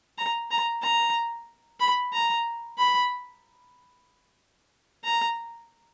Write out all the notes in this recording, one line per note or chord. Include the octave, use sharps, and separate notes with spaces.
A#5
A#5
A#5
B5
A#5
B5
A#5